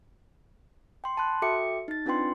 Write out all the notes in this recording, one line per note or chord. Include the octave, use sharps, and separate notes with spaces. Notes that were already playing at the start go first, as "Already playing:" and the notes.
G5 C6
A5 B5 C6 F#6
F#4 A4 E5 G5 D6 C#7
D#4 A6
C4 D4 F4 B4 G5 C6